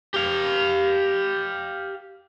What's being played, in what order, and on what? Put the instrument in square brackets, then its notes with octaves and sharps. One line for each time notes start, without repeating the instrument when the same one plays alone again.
[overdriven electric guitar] G4 F5